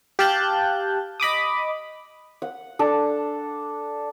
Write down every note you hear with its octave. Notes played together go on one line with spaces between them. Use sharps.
G4 F5 A5 F#6 G6
D#5 B5 D6 D#6
F#5
D4 A4